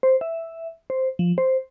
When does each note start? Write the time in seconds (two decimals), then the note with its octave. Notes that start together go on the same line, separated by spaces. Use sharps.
0.03 C5
0.21 E5
0.90 C5
1.19 F3
1.38 C5